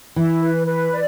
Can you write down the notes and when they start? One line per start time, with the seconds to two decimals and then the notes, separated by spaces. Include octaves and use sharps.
0.16 E3 E4
0.41 B4
0.67 B4
0.91 D5